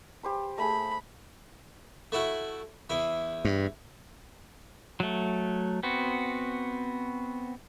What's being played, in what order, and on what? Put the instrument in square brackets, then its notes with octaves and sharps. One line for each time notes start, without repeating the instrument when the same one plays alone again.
[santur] G4 C5 B5
[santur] A3 G#4 [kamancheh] B5
[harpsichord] A3 E4 F#4
E2 E4
[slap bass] G2
[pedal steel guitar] F#3 A3
B3 C4 F#4